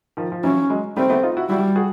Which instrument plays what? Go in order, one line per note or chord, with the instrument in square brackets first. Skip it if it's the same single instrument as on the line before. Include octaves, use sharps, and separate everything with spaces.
[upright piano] D#3 F3
F3
[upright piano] E3 F#3 [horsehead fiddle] C#4
[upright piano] F#3 G#3
[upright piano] G3 A3 [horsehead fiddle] C4
[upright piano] A3 B3
D#4 F4
E4 F#4
[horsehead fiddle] G3 [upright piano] E4 F#4
[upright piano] F#4 G#4